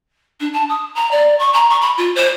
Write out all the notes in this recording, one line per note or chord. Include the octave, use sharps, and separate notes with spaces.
D4
A5
D#6
A#5
D5
C#6
A#5
C#6
B5
F4
C5